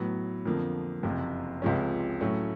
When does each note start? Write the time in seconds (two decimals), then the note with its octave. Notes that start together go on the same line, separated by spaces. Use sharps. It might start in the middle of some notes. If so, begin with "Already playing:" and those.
Already playing: A2 F#3 B3
0.45 F2 D3 F3 A#3
1.03 F#1 F2 C3
1.62 C#2 C3 F3 G#3 C#4
2.21 A2 F#3 A3 C#4